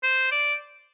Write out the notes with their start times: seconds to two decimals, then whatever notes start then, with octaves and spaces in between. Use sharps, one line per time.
0.03 C5
0.31 D5